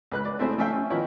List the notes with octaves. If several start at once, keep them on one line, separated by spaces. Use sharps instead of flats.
C#2 B4 F#6
D5
A3 C4 E4 G#4 C5
A3 C#4 A4 E5 F5 G5
C#4
D#3 F3 B3 D#4 E4 C#5